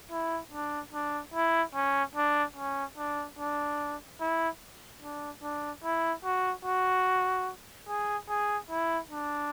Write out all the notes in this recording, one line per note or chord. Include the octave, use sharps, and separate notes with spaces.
E4
D4
D4
E4
C#4
D4
C#4
D4
D4
E4
D4
D4
E4
F#4
F#4
G#4
G#4
E4
D4